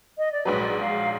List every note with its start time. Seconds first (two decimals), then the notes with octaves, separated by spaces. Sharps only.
0.17 D#5
0.32 D5
0.45 A#1 G#2 F#3 B4
0.62 D5
0.79 F5